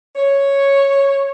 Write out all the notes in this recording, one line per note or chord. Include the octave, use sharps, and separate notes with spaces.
C#5